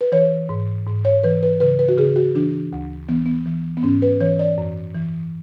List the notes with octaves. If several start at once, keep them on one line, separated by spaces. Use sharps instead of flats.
B4
E3 C#5
G#2
G#2
C#5
E3 B4
B4
C#3 B4
B4
F#4
C#3 G#4
F#4
E3 D4
D2
E3 B3
B3
E3
B3
G#2 C#4
B4
E3 C#5
D5
F#2
E3